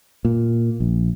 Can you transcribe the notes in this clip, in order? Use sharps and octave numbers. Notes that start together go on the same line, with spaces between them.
A#2
A#1